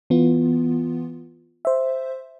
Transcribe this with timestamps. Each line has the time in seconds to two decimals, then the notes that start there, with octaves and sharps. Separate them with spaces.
0.10 E3 B3 F4
1.65 C5 E5